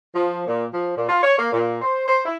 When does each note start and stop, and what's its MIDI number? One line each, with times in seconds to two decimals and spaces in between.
0.13 0.41 53
0.46 0.64 46
0.72 0.94 53
0.95 1.05 46
1.07 1.20 65
1.22 1.35 73
1.37 1.51 58
1.52 1.76 46
1.81 2.04 72
2.06 2.22 72
2.24 2.35 64